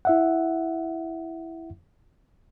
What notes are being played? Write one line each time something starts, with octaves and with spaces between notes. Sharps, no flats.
E4 E5 F#5